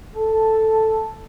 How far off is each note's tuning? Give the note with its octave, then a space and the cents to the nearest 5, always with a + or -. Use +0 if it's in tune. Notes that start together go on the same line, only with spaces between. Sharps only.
A4 +0